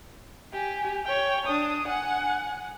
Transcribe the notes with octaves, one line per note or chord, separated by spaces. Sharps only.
G4 G#5
C#5 G5
D4 D#6
F#5 G#5